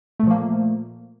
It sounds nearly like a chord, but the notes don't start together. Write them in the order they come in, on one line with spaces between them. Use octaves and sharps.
A3 A#2 F3 A#3